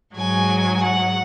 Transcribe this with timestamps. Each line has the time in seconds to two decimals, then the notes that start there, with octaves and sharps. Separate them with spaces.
0.15 G#2 F#3 G#5
0.82 F#5